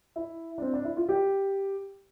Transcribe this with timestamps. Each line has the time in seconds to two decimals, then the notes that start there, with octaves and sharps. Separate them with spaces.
0.16 E4
0.58 D4
0.62 C4
0.73 D4
0.85 E4
0.97 F4
1.09 G4